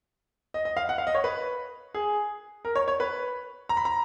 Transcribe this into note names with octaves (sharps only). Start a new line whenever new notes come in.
D#5
D#5
F5
F#5
F5
D#5
C#5
B4
G#4
A#4
C#5
C#5
B4
A#5
B5
A#5